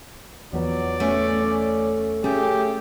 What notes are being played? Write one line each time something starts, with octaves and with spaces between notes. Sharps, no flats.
E2 F3 F#3 B3 D5
A3 C#4
C#4
A3 C#4 G4 G#4